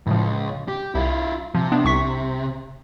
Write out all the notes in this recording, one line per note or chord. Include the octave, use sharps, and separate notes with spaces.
C#2 A2 F3
G4
C2 E4 F4
C3 F3
B3 D4
C2 C#6 B6